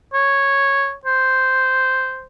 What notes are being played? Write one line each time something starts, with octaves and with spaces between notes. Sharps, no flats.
C#5
C5